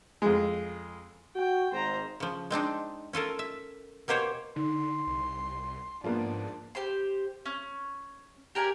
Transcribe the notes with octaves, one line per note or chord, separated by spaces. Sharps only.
F2 G#3
F#4 G5
G#1 G#2 C5 A#5
C#3 F3
G#3 C4 D4 D#4
C#4 F4 A4 A#4
E5
B2 A#3 G4 C5 C#5
D3 D#4 C6
C2
G#2 F3 A#3 B3 D4
G4 C5 C6
C#4
G4 A#4 D5 G#5